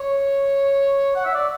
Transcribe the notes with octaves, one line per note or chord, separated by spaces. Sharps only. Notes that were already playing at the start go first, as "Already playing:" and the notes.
Already playing: C#5
F#5
E5
D5